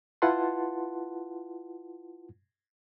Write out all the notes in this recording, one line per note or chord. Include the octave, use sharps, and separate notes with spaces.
E4 F4 B4 F#5 A5 C6